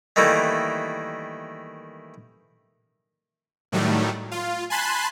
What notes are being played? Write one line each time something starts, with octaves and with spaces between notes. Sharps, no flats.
D#3 E3 G3 A3 A#3
A2 D#3 F#3 G3 A3
F4
G#5 A5 B5 C6 F#6